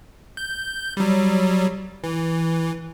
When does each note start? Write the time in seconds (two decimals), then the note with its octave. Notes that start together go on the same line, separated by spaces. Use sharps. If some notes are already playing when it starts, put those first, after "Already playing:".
0.37 G6
0.97 F#3 G3
2.04 E3